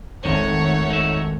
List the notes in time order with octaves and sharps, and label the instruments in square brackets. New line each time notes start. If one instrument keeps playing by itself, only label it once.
[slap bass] G#1 F2 [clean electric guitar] D#3 [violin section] A3 C#5 F#5
[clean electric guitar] D#4 E5